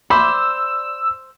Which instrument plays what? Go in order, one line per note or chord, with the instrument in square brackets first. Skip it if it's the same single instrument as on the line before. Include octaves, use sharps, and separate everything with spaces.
[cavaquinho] C5 [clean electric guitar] D5 [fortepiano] B5 [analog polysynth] E6